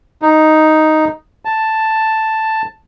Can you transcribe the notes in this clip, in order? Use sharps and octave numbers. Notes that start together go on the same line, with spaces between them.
D#4
A5